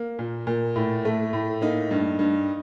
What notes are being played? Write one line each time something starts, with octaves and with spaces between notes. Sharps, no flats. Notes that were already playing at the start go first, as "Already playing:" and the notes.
Already playing: A#3
A#2
A#2
A2
A3
A2
A#3 D#4
G2
G2